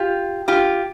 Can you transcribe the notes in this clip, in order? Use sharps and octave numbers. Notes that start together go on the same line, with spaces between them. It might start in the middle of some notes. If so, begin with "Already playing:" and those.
Already playing: F4 G4
F4 G4